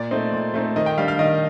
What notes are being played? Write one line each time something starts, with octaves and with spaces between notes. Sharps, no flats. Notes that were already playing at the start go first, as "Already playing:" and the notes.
Already playing: A#2 D5
A3 C4 D#4
A#2
A3 C4 D#4
D#3 D#5
G5
G3 D4 F5
F5
D#3 D#5